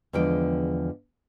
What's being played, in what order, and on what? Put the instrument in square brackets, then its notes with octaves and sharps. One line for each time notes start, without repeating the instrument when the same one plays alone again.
[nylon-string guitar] E2 D3 F3 G#3 G5